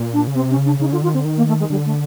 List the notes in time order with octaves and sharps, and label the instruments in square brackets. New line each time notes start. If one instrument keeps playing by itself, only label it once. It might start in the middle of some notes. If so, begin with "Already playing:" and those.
Already playing: [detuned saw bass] A#2
[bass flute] D4
[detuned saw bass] C#3
[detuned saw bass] C3 [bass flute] C4
[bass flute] C#4
[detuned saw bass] C#3
[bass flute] D4
[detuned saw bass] C#3 [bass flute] D#4
[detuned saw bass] D3 [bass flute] F4
[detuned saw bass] D#3 [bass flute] F4
[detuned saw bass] D3 [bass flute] C4
[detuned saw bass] D#3
[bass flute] A#3
A3
G#3
[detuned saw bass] D3 [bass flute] G3
[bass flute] A3